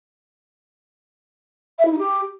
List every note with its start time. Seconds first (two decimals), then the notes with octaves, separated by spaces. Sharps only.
1.79 E5
1.85 E4
1.92 D#4
1.98 G4